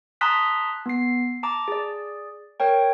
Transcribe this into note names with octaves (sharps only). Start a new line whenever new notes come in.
A5 A#5 C6 D#6 F#6 B6
B3 C7
A5 A#5 D6
G#4 D5
A#4 C#5 G5